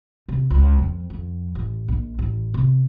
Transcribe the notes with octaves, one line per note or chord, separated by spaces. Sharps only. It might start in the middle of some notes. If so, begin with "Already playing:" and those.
C3
C#2
F2
F2
A1
A#1
A1
C3